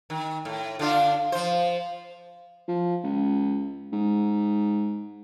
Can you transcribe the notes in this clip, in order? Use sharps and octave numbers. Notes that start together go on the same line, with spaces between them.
D#3
A2
D3 D4 F4
F3 C5
F3
C#2
G#2